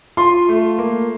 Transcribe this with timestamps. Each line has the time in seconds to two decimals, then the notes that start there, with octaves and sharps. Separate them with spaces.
0.17 F4 C6
0.49 A3
0.79 A#3